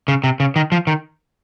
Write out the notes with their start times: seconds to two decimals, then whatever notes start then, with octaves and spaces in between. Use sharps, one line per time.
0.08 C#3
0.24 C3
0.40 C#3
0.56 D#3
0.72 F3
0.87 D#3